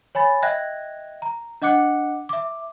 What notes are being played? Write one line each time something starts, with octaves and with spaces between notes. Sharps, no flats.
C#5 G#5 B5 A6
D#5 E5 G5 F#6 G#6 A#6
A#5
D4 D#5 F#5 D6 F#6 C#7
E5 D6